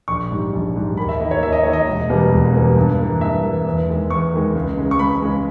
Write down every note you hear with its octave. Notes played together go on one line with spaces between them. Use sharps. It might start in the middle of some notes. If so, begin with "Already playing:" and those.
A#1 C#6
G#2 G3
A#1
G#2 G3
D#2 B5
E5
D#3 A#3 D#5
C#5
D#2 E5
D#5
D#3 A#3 C#5
D#5
E1
E2 B2 G3 A#3
E1
E2 B2 G3 A#3
G2
E3 A#3
G2 E5
E3 A#3
E2
D#3 G#3
E2 C#6
D#3 G#3
C#2
C#3 G#3
C#6
C#2 B5
C#3 G#3